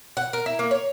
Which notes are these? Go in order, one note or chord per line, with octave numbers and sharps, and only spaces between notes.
F#5
A#4
E4
A#3
C#5